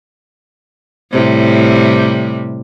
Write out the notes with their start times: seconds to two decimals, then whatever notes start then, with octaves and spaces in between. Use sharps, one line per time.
1.12 A2 C3 G3